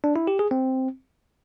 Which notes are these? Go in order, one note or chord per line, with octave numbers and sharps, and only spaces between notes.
D4
E4
G4
G#4
C4